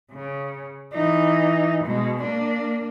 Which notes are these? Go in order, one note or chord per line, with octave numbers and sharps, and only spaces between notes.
C#3
E3 D#4
B2 G#3
A#3 D4